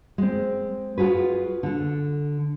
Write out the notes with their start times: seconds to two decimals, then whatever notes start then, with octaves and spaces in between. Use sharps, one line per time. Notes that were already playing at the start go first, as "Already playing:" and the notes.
0.18 G#3 C4
0.98 F4 F#4 G#4 B4
1.63 D3 A4